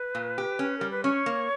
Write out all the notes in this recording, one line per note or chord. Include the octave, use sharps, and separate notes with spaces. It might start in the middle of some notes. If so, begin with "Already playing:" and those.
Already playing: B4
A#2
G4
C#4
G3 A#4
B4
C#4 C#5
A#3